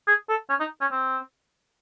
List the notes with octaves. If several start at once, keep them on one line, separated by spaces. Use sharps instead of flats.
G#4
A4
C#4
D#4
C#4
C4